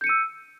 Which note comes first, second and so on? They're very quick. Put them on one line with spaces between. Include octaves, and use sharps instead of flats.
G6 C#7 D#7 E6